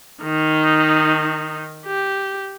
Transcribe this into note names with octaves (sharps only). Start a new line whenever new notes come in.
D#3 D#4
G4